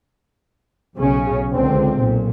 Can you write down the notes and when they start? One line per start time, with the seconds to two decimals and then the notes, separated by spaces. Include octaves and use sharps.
0.97 B1 C#3 C#4
1.53 C#2 D3 C4
1.97 B1 A#2